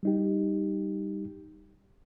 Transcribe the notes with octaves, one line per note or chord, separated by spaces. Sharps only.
G3 D#4 G4